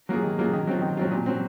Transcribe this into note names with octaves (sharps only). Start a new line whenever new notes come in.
F#3 A#3 F4 G#4
D#3
F#3 A#3 F4 G#4
D#3
F#3 C4 F4
D#3
F#3 C4 F4
A#2
F#3 C4